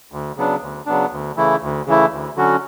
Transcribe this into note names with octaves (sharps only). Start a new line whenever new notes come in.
D2
C#3 F#3 B3 D4
D2
C#3 F#3 B3 D4
D2
C#3 E3 A3 E4
D2
C#3 E3 A3 E4
D2
D3 F#3 C#4 F#4